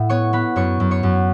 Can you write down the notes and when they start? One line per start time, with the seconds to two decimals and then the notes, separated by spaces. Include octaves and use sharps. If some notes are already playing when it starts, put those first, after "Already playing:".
Already playing: A2 E5 F#5
0.10 B3 C#5 C#6
0.33 B3 B4 B5
0.56 F#2 C#5 C#6
0.80 F#2
0.91 C#5 C#6
1.03 F#2